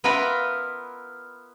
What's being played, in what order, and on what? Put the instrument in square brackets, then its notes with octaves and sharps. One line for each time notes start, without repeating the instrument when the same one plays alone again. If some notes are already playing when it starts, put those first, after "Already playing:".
[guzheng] B3 E4 F4 A#4 B4 B5